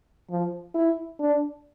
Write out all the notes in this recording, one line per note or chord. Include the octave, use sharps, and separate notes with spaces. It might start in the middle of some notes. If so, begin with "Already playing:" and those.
F3
E4
D4